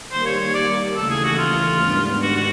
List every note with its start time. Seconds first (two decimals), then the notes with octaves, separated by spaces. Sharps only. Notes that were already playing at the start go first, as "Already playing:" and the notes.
0.12 D#3 G3 A#3 C5
0.26 C#5
0.40 C#5
0.54 D5
0.96 D#2 C#3 E3 A3 A4
1.10 G#4
1.24 F#4
1.38 F4
1.81 G#2 D#3 G3 B3 D4
2.22 F#4
2.37 F#4